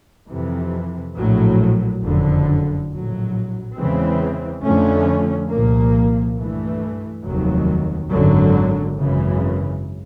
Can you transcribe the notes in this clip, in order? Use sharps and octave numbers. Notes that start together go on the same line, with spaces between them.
F2 C3 E3
A#1 A2 F#3
F#1 F2 D3
A#1 A2 F#3
E2 C#3 E3 G#3 C4
F2 D3 F3 A3 C#4
C2 A#2 F3 A#3
G2 E3 A3
F1 D#2 D#3 F#3
G#1 F#2 D3 F#3
G#1 F#2 C#3 E3